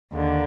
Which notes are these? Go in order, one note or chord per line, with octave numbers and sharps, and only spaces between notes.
D#2 D3